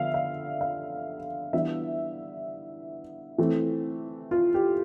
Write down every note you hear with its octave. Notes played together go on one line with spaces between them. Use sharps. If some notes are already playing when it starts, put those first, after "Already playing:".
Already playing: D3 F3 B3 D4 E5 F5
F5
F5
E3 G3 B3 D4 E5
E3 A3 C4
F4
G4